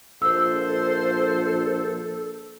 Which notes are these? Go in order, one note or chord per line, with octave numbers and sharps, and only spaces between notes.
A#1 A4 C5 E6